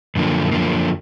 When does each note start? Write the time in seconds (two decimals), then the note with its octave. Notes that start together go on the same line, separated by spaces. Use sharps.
0.16 F#2 D3 F3 A#3
0.52 F#2 D3 F3 A#3